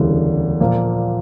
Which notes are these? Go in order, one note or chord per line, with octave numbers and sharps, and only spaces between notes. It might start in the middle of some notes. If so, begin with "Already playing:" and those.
Already playing: E1 D2 C#3 E3 G3
A#2 F3 A#3